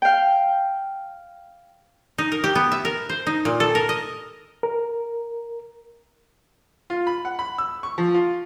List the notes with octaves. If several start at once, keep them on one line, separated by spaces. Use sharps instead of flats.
F5 G5
D#4
A#4
G4
B3
E5
A#4
C5
D#4
A#2
A4
A#4
D#5
A#4
F4
B5
F#5
B5
E6
C#6
F3
F4